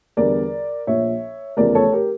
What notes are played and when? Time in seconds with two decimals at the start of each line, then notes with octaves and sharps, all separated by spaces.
0.17 E2 D3 G3 A#4 D5
0.87 A#1 A#2 F3 C#5 E5
1.57 F1 E2 C#3 F3 A3 A#4 D5
1.75 A4 C#5
1.92 G4 A#4